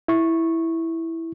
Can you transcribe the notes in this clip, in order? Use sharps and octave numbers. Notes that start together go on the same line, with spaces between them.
E4 C#6